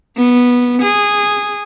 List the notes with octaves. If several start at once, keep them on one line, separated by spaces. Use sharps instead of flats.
B3
G#4